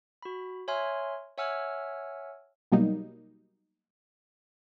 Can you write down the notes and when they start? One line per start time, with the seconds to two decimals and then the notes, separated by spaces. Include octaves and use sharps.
0.22 F#4 B5
0.68 C#5 E5 G#5 C6 F6
1.38 C#5 E5 F#5 G#5 E6 F6
2.72 B2 F#3 G3 A#3 D#4